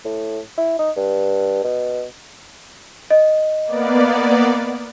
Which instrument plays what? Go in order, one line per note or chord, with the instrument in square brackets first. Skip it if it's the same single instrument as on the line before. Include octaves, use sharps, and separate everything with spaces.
[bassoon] A2
E4
D#4
G2
B2
[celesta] D#5
[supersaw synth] A#3 B3 D5